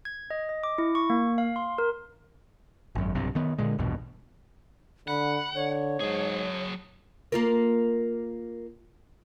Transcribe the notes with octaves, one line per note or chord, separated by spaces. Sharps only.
G#6
D#5
D#5
D6
E4
C#6
A#3
F5
C6
A#4
G#1 F#2
B1 G2 C3
D#3 B3
A#2 D3 G#3
A#1 E2 G2 B2
D3 F#5 B5
D3 C#5
G#2 F#3 G#4
A#3 F4 A#4